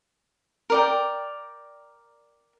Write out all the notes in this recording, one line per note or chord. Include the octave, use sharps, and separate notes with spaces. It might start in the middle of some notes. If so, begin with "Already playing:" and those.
A#4 D5 G5